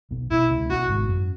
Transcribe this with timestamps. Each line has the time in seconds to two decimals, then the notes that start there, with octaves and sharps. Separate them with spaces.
0.11 B1 B2
0.31 B1 B2 E4
0.50 C#2 C#3
0.70 B1 B2 F#4
0.89 G#1 G#2
1.09 F#2